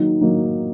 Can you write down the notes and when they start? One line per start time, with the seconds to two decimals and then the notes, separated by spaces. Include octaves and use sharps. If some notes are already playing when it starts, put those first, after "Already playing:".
Already playing: D#3 F#3 A#3 D#4
0.21 D#3 F#3 A#3 D#4